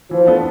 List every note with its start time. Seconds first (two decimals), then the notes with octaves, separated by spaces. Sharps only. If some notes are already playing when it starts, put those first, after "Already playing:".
0.11 E3 F3
0.27 B3 D4 A4